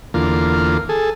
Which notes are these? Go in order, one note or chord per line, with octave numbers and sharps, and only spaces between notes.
E2 D3 A#3 F4
G#4 A4